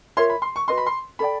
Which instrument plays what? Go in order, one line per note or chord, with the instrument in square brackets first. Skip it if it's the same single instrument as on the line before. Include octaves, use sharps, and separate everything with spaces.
[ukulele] F4 A#4 C#5 E5 [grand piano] C6
[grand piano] B5
C6
C#6
[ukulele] F#4 B4 D#5 [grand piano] C6
[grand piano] B5
C6
[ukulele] A4 D5 G5 [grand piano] B5